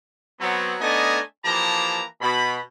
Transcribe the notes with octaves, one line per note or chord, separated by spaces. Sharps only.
F#3 B3 C4
A3 B3 D4 D#4 D#5 G#5
E3 F3 A#3 G4 A5 A#5
B2 B5